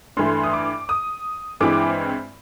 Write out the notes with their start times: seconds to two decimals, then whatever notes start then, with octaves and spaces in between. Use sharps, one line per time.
0.17 G2 E3 A3 C6
0.43 D#6
0.53 D6
0.89 D#6
1.60 G2 E3 G#3 C4 E4 D6